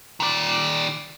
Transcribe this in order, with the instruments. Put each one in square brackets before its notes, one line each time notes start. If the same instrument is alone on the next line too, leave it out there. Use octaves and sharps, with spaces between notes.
[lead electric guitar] D#3 D5